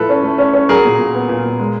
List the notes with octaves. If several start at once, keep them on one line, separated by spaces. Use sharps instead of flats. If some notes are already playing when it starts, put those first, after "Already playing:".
Already playing: A2 F3 A4 B4
C#4
A3
C#4
C#4
F#3 G#4 A#4
A#2
A#2
B3
A#2
A#2
G#3